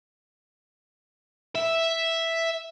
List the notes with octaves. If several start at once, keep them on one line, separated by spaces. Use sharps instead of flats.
E5